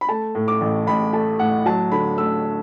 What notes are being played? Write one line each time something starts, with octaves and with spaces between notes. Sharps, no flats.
B5
A3 A5
A2
D6
A1
A1 B5
A3 A5
A2 F#5
F#3 A5
D3 B5
A3 E6